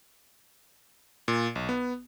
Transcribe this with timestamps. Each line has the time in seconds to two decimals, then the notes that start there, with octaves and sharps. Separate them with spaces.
1.28 A#2
1.56 B1
1.69 B3